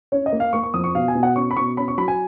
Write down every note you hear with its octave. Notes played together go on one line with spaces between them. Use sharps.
C#4 C#5
D#5
A#3
F5
A#3 C#6
C#6
F2 D#6
C#6
B2 F5
G#5
B2
F#5
C#4 C#6
B5
B2 C#6
C#4 B5
C#6
F#3 B5
G#5